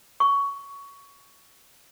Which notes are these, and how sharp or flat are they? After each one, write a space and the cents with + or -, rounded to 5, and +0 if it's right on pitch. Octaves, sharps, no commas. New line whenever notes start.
C#6 +15